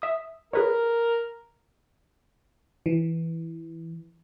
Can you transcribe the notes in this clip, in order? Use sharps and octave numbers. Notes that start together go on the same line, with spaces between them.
E5 D#6
G#4 A#4 B4 C#5
E3